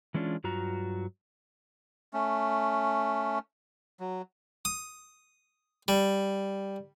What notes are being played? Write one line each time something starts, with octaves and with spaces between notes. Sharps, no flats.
E3 G#3 C#4 D4 E4 F4
G2 F#3 F4 F#4 A#5
A3 C#4
F#3
D#6
G3